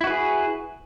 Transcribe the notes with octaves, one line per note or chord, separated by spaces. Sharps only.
E4 F#4 G#4 B4